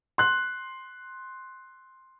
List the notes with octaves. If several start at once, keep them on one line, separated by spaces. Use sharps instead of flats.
C6 F#6